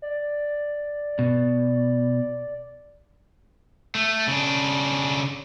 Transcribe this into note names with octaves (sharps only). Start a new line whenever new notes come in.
D5
B2
A3
C#3 D4